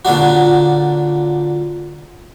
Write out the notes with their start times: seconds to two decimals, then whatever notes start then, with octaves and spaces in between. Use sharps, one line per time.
0.05 A#2 D3 C#4 D4 F#4